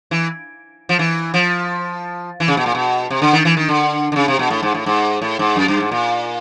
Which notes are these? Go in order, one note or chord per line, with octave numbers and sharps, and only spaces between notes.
E3
F3
E3
F3
E3
C#3
B2
A#2
B2
C3
D3
D#3
E3
D#3
D3
D3
C#3
C3
B2
A2
G#2
A2
G#2
A2
G#2
F#2
G2
G#2
A#2